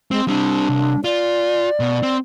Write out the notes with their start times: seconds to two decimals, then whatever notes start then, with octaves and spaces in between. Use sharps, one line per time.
0.11 G#3 C4
0.28 G3 C4 D4
0.69 C2
1.04 F4 D5
1.80 B2
2.03 C4